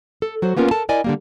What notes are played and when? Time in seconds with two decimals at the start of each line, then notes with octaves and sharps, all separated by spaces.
0.22 A4
0.42 F#3 F#4 C5
0.56 A#3 B3 C#4 F4 A#4
0.71 A4 A#4 A5
0.89 E4 A#4 D5 D#5 G#5
1.04 D3 G3 A#3